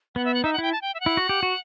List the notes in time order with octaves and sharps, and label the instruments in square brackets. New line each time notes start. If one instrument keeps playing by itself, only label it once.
[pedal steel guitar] B3 [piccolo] F#5
[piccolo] E5
F#5
[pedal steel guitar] D#4 [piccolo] E5
[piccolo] F#5
[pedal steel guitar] E4 [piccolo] G5
[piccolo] A5
G5
E5
F#5
[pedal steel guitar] E4
F#4
G4
F#4